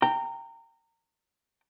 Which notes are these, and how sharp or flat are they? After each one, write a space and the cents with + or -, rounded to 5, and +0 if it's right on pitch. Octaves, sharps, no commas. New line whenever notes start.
G5 +0 A#5 -25